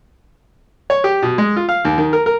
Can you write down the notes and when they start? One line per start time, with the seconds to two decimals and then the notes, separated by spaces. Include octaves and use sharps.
0.90 C#5
1.04 G4
1.22 B2
1.38 G#3
1.56 F4
1.69 F5
1.85 D#2
1.98 D#3
2.13 A#4
2.26 A#4